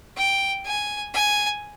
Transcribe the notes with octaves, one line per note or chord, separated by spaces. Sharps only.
G5
G#5
G#5